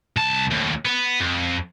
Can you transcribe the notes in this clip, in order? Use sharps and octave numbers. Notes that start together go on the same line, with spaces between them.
C2 A5
D#2 A2
B3
F2